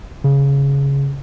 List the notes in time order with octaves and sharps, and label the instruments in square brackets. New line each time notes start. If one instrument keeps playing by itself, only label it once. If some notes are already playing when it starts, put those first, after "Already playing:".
[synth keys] C#3